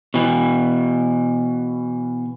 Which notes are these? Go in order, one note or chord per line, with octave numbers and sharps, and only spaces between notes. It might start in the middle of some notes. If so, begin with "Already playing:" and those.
B2 E3